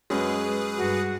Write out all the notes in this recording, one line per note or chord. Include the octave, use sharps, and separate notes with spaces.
F#2 G#3 G#4 B4
G2 F#4